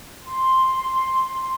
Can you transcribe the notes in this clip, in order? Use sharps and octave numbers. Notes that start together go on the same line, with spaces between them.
C6